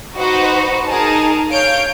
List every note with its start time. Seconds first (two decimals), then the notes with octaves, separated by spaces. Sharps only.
0.16 D#4 F#4 B4 C5
0.87 D#4 G#4 A#4 A5
1.52 C#5 F5 G6 D7